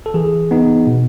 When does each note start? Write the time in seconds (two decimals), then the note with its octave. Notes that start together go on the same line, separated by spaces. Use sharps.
0.06 A4
0.14 E3 G#4
0.51 B3 D#4
0.87 B2